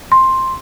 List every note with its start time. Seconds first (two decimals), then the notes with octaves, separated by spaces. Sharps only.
0.12 C6